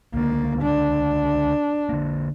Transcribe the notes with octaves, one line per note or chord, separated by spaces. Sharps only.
C#2 D3 A#3
D4
D3 A#3